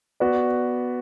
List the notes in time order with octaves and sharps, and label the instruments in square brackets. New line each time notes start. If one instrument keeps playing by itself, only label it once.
[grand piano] B3 F#4 B4 D5